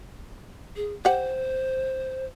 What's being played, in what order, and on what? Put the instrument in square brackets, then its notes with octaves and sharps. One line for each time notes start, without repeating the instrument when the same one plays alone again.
[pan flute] G#4
[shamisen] G4 F#5 [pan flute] C5